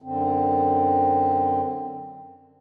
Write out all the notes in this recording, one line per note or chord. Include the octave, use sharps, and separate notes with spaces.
F#2 D3 C4